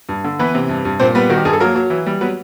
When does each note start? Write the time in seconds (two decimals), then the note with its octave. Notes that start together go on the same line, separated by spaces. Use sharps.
0.09 G2
0.24 D3
0.39 E3 B3 B4
0.55 C3
0.69 G2
0.85 G2
1.00 A#2 C4 C5
1.15 G3 B3 B4
1.30 D#3 F#4
1.37 G4
1.45 G2 G#4
1.53 A4
1.60 F#3 A#3 A#4
1.75 F#3
1.90 E3
2.06 G3
2.21 F#3 B3 B4